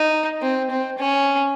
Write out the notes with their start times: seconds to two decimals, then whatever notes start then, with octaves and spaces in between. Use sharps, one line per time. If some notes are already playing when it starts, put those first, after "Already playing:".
Already playing: D#4
0.42 C4
0.70 C4
0.98 C#4